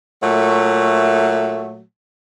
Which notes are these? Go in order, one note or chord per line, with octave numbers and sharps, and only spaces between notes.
A#2 F#3 A3